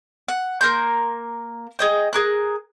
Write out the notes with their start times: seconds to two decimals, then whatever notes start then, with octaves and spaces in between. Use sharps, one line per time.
0.28 F#5
0.61 A#3 A#4 C6 G6
1.79 G#4 D#5 G5
2.13 G#4 A#4 F#6